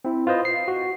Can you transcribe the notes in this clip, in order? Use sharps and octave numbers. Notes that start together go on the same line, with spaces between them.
C4 E4
F4 B4 C5 D#5
C7
F#4